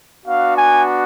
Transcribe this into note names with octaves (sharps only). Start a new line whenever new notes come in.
B3 D4 F#4 F5
G#5